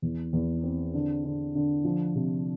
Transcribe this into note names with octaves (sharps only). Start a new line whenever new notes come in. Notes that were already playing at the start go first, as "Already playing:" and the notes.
E2
E2
C4
D3
D3
D3
F3
C3